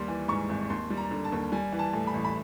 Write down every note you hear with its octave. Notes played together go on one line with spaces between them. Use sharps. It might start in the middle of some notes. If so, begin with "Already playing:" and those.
Already playing: D#2 G3 C6
E3
G#2 C#6
G#1
D#2 C6
G3
A#5
D3
A5
D#2
G3 G#5
E3
A5
A2
B5
A1
B5